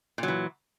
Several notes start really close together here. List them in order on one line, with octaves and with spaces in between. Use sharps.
A#2 F#3 E3